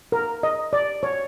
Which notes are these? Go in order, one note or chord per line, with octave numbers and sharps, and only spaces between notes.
A#4
D#5
D5
C#5